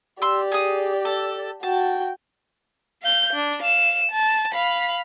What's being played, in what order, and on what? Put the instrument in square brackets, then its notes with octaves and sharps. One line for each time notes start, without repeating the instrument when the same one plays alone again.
[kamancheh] G4 D5 [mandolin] C6 E6
[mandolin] G#4 D#6
A4
[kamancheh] F#4 G5 [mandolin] A5
[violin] F5 G6
D4
F5 E7
A5
F5 B5